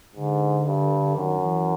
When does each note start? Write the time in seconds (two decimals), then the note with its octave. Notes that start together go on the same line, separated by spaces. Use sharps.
0.16 G#2 D3
0.67 G2
1.16 F#2 D#3
1.41 E3